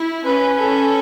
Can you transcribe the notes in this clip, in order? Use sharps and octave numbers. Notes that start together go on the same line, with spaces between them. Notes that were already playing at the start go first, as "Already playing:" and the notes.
Already playing: E4
C#4 B4
A4